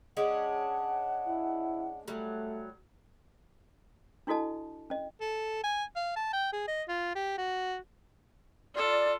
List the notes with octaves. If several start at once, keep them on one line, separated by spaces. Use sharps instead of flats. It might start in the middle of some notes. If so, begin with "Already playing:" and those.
G#3 C#4 D4 F#5
E4
F#3 G3 A3
D4 E4 F#4 A4 D#5 A5
C#4 D#5
A4
G#5
F5
A5
G5
G#4
D#5
F4
G4
F#4
F4 A4 D5